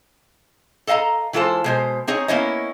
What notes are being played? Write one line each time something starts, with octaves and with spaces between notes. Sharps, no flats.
A4 D#5 F5 G#5 A#5
E3 G#3 F4 A4 C5
B2 G#3 C5
C4 D#4 G#4 C#5
A#3 B3 C#4 E4 C#5 D#5